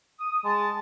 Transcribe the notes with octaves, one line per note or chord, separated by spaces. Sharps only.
D#6
G#3 A5